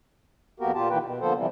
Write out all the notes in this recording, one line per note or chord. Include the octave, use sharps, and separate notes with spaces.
F2 A#3 B3 F#4 G4 A#4
A#2 F4 G4 A5
A#2 D#3 E3 A#3 B4 G5
B2
D3 F3 A#3 B3 A4 C5
C3 E3 F3 G3